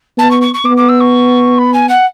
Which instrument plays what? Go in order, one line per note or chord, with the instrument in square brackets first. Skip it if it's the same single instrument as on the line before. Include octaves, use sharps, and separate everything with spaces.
[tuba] B3 [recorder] A5
[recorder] C#6
C#6
C#6
[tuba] B3 [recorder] D6
[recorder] D6
E6
C#6
B5
G#5
F#5